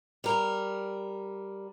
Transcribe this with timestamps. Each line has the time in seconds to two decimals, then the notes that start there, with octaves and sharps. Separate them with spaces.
0.24 G3 A#4